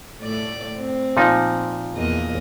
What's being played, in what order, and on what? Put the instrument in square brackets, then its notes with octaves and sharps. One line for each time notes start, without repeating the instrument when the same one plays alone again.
[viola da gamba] A2 A3 D5
C4
[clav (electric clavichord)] A#2 F3 D#4
[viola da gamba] E2 A#3 D#5